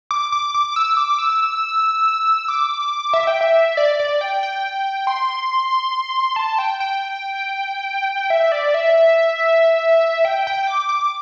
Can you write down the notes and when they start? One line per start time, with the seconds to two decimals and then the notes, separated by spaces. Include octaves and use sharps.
0.11 D6
0.32 D6
0.54 D6
0.76 E6
0.97 D6
1.18 E6
2.48 D6
3.13 E5
3.27 G5
3.41 E5
3.77 D5
3.99 D5
4.21 G5
4.43 G5
5.07 C6
6.36 A5
6.59 G5
6.80 G5
8.30 E5
8.52 D5
8.74 E5
10.25 G5
10.47 G5
10.67 D6
10.89 D6